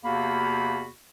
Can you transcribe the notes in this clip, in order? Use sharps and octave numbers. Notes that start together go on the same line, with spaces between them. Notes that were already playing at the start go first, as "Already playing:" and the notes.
E2 C3 A#3 F#4 F5 B5